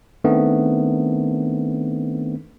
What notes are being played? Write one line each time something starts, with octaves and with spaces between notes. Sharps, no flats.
D#3 A3 B3 C4 D4